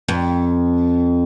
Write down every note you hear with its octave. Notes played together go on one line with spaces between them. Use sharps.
F2